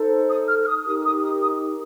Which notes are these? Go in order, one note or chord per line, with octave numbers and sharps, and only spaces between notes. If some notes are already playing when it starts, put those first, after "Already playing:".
Already playing: D#4 A4 C5
D#6
F6
F6
D#6
D#4 G4 A#4 D#6
D#6
D#6
D#6